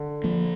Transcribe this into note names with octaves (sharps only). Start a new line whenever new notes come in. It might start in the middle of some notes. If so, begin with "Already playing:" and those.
Already playing: D3
F3 A#3